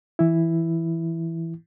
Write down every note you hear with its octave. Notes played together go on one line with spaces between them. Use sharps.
E3 E4